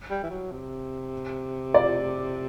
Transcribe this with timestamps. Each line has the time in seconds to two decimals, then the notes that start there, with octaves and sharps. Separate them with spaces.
0.10 G3
0.23 E3
0.31 F#3
0.51 C3
1.74 D5